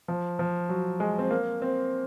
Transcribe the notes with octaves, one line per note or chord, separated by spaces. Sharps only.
F3
F3
F#3
G#3
C4
A#3
C4